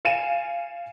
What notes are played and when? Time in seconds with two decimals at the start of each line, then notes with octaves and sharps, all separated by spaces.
0.05 F5 G#5 C#7 D#7 E7